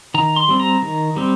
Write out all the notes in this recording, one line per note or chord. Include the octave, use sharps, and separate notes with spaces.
D#3 A#5
C6
G3 C4
A#5
D#3
G3 C4